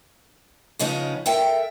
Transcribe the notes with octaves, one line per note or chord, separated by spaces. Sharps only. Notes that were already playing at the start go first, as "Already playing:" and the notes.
C#3 F3 G#3 B3 C#4 D#4
A4 A#4 E5 G5